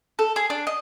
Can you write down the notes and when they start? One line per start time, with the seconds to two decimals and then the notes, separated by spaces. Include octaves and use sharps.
0.19 A4
0.36 G#4
0.50 D4
0.67 D#5